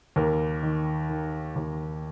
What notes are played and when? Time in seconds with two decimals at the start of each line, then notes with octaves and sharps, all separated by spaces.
0.16 D#2 A#4
0.63 D#3
1.09 D#3
1.56 D#2